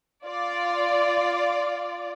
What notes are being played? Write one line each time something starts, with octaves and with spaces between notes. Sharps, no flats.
F4 D5